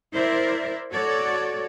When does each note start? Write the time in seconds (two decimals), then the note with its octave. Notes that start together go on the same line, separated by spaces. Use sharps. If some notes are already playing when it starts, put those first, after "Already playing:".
0.13 E4 A#4 C5 D5 E5
0.92 F#4 A4 C#5 D5